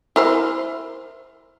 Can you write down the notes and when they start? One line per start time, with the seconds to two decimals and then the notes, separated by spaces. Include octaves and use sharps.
0.16 E4 A#4 C5